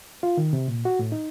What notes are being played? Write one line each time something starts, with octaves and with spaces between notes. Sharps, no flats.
F4
D#3
C3
A#2
F#4
A2
D#4